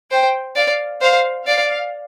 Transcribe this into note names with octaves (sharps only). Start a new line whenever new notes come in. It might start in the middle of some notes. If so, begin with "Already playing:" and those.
C5 G5
D5 F5
C5 F5
D5 F5